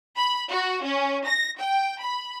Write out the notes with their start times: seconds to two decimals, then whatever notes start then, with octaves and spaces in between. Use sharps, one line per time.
0.16 B5
0.50 F#4
0.83 C#4
1.26 A#6
1.60 G5
2.03 B5